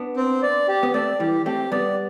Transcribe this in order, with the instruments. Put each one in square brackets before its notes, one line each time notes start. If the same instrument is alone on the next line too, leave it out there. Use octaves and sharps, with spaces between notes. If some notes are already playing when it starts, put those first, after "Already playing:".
Already playing: [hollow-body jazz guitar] B3 D4
[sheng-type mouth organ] C4
D5
G4
[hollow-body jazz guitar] B3
[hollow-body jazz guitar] A3 C4 [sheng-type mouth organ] D5
[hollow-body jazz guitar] E3 G3 [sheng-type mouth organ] G4
[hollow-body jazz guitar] A3 C4 [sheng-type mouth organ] G4
[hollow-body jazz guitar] G3 B3 [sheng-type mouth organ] D5